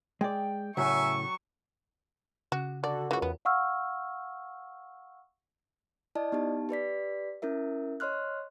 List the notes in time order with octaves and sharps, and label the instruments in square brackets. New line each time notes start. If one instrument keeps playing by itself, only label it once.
[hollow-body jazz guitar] G#3 D5 [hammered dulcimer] G5
[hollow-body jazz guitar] A2 C#3 [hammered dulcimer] F#3 [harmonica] E5 G#5 [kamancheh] C#6
[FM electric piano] C#3 [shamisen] F#4
[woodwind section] D3 F#4 A4 [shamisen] D5
[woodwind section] C#2 F#2 [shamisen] E3 F#4
[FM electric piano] E2 [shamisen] B3
[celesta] F5 F#5 C#6 E6 F6
[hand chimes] E4 D5 D#5 A5
B3 D#4 G4 A5
G4 B4 D5 B6
C#4 E4 A#4 E5
C#5 D#5 C6 F6 F#6